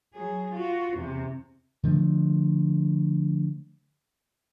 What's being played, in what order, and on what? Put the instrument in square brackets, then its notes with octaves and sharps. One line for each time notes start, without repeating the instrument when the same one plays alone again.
[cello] F#3 G#4
F4 F#4
E2 C3
[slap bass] D3 F3 A3